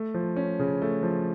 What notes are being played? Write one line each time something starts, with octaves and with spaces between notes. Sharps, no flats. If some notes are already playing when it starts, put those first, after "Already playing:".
Already playing: A3
F3
C#4
C#3
A3
F3